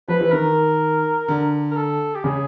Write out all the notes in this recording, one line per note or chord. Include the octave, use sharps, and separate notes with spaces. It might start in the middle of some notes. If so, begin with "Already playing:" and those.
F3 B4
E3
D#3 A#4
D3
A#4
A4
G4
C#3 G#4